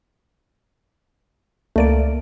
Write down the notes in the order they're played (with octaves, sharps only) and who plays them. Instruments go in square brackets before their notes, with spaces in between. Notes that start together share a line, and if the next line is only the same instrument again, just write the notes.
[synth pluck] C#2 D5 D7 [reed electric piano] A3 A#3